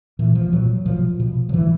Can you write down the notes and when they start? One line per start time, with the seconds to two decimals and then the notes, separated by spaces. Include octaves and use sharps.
0.19 A#2 E3
0.35 F3
0.53 A#2 F#3
0.86 B2 F3
1.20 B2
1.49 F3
1.53 A2 E3